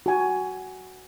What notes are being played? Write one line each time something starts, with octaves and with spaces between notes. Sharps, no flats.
F#4 G#5